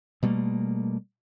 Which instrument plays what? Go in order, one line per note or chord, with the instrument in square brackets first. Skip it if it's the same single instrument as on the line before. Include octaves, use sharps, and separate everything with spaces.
[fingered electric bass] B2 G3 A3 A#3